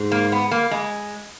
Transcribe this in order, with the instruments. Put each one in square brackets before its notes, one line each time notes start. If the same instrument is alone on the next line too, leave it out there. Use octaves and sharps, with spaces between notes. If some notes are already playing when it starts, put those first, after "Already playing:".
Already playing: [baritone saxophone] G#2
[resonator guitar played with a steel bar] A#3
B3
A#3
G#3